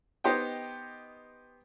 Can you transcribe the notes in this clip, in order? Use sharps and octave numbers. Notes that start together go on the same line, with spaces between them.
B3 D#4 G4 C5 D#5 G5